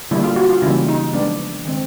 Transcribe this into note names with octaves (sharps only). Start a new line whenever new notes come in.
D3 G3 A#3 E4
F4
F#4
F4
C#3 E3 G3 A#3 C#4 E4
D#4
F3 G#3 B3 D4
D#3 G#3 C4